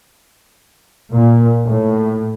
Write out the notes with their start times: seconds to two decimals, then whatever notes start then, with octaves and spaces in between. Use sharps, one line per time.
1.12 A#2
1.65 A2